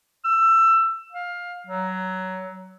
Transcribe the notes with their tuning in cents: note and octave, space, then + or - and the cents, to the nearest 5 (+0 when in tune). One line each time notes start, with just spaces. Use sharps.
E6 +20
F5 +15
F#3 +15